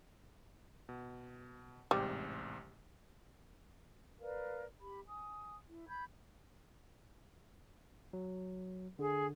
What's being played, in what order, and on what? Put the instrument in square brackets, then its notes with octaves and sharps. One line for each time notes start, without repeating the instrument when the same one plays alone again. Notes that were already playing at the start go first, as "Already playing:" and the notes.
[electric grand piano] B2
[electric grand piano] A1 G#2 C3 [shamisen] G3
[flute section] A#4 B4 D5 F5
G4 B5
G#5 D#6
E4
B5 G6 G#6
[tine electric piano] F#3
[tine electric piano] D3 [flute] G#4